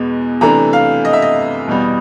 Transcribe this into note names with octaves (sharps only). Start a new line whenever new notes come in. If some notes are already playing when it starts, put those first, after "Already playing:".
Already playing: E2 B2 G#3 B3
C3 E3 A3 D4 A#5
F5
D#5
E5
D#5
E2 B2 G3